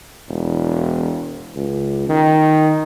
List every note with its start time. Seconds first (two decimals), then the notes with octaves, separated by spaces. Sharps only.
0.29 E1
1.55 C#2
2.08 D#3